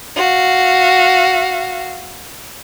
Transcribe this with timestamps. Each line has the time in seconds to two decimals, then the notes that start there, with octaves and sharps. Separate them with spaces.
0.16 F#4 F5